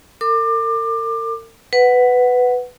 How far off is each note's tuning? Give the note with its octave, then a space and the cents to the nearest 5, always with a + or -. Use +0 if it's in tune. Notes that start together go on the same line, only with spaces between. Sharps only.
A#4 -45 D6 +25
B4 +10 F#5 +0